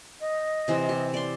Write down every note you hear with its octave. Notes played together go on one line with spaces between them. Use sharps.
D#5
C3 E3 C5
G4
D5 C6